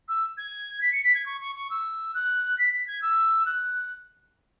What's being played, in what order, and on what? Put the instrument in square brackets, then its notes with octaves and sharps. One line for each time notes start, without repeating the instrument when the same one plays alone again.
[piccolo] E6
G#6
B6
C#7
B6
G#6
C#6
C#6
C#6
E6
F#6
B6
B6
G#6
E6
F#6